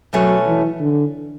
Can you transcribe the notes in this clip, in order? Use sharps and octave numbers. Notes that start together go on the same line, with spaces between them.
B2 F#3 A3 C#4
E3
D3